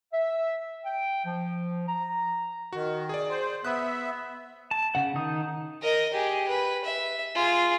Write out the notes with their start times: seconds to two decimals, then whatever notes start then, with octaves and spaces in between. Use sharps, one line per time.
0.13 E5
0.85 G5
1.25 F3
1.88 A#5
2.73 D#3 F#4
3.09 G#4 D5
3.29 C5
3.65 B3 E5 B5 D#6 F#6
4.71 A5
4.95 C#3 F#5
5.15 D#3 D#4 D#6
5.82 A#4 D#5
6.14 G4 G#4
6.49 B4
6.85 E5
7.35 F4 G#4